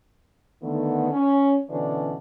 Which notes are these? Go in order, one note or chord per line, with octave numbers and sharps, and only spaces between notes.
D3 D#3 A3 B3
C#4
B2 D3 E3 C#4 D4